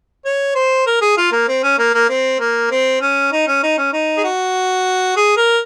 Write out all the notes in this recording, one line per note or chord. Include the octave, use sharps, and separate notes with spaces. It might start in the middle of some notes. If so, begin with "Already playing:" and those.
C#5
C5
A#4
G#4
F4
A#3
C4
C#4
A#3
A#3
C4
A#3
C4
C#4
D#4
C#4
D#4
C#4
D#4
G#4
F#4
G#4
A#4